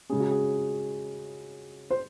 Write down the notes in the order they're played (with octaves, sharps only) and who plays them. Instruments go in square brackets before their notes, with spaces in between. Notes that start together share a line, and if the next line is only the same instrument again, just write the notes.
[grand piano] C#3 G#3 C#4 G#4
F#4
G#4
C5